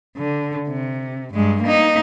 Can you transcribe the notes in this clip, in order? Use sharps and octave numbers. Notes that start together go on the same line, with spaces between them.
D3
C3
G2 G#3
A#3 D#4